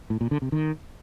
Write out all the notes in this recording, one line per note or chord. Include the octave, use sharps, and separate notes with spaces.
A2
A#2
D3
C3
D#3